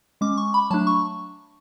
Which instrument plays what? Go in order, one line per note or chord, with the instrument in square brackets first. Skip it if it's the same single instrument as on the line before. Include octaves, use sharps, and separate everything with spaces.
[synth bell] G#3 C#4 D6
C#6
B5
F#3 A3 D4 A5
C#6